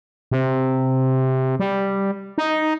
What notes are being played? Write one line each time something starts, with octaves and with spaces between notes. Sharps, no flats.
C3
G3
D#4